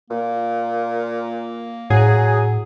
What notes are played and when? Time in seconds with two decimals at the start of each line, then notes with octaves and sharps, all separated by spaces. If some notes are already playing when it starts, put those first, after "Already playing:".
0.10 A#2 A#3
1.90 A2 F#3 G#4